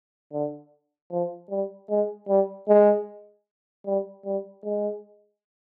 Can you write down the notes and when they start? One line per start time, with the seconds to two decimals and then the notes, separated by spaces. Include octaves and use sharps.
0.33 D3
1.11 F3
1.50 G3
1.90 G#3
2.29 G3
2.68 G#3
3.86 G3
4.25 G3
4.64 G#3